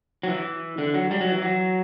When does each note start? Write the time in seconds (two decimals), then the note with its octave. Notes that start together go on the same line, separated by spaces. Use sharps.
0.23 F#3
0.28 E3
0.78 D3
0.94 F#3
1.11 G3
1.21 F#3
1.32 E3
1.42 F#3